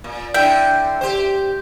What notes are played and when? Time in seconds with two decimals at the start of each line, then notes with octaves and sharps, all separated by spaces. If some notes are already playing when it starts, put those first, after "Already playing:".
0.04 A#2
0.34 D3 E4 E5 G5
1.01 G4 C5